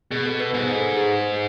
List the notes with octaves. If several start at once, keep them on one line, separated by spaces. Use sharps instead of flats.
B2 G#4
A4
B4
G#2 B4
B4
A4
G#4